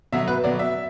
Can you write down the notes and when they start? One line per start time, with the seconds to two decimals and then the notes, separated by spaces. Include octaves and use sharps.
0.12 B2 F#3 E5
0.28 B4
0.44 B2 F#3 D5
0.59 E5